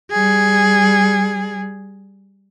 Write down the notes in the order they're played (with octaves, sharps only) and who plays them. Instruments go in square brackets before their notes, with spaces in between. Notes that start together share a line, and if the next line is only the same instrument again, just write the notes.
[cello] G3 G#4